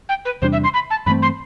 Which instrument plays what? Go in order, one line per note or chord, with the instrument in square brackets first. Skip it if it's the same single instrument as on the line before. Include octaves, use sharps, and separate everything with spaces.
[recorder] G5
B4
[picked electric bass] E2 C3 G3 D4 [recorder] C5
[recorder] E5
C6
B5
A5
[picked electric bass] G2 E3 A3 C4 [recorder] B5
[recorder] C6